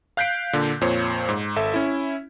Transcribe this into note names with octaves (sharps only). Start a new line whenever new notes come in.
F5 F#6 G6 B6 C7 D7
A#2 D3
F2 A#2 C5 C#5
G#2
G#1 A4 E5
C#4 E4